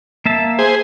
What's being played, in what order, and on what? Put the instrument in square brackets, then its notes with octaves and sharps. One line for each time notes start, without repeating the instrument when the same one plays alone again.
[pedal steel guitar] A#3 E5 A5
[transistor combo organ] G#4 C5